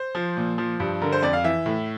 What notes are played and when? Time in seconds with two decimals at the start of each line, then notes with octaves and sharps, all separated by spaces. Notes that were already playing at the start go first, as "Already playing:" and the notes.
Already playing: C5
0.15 F3
0.37 A#2
0.58 F3
0.80 G2
1.01 D3 A#4
1.12 C5
1.22 F2 D5
1.33 F5
1.44 E3 E5
1.66 A2